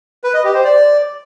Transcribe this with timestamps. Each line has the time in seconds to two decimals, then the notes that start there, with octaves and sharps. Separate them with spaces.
0.24 B4
0.34 D#5
0.44 G4
0.54 C5
0.65 D5